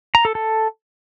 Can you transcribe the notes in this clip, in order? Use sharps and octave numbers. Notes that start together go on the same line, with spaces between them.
A#5
A4
A4